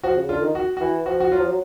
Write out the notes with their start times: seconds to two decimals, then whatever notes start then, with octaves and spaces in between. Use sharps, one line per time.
0.03 F3 F#4
0.16 C#3
0.29 D3 F4
0.42 D#3
0.55 F#4
0.77 F#4
0.81 E3
1.06 F3 F#4
1.20 F#4
1.32 F#3 F4
1.40 F3
1.47 F#3